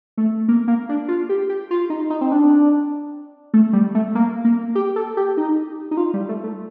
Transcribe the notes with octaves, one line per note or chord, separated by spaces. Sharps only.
A3
A#3
A#3
D4
F4
G4
G4
F4
D#4
D#4
C4
D4
A3
G3
A3
A#3
A#3
G4
A4
G4
D#4
D#4
F4
G3
A3
A3